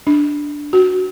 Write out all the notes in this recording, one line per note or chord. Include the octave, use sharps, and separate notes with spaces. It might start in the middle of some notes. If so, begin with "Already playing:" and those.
D4
F#4